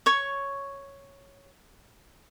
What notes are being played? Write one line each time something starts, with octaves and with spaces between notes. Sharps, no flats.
C#5 C#6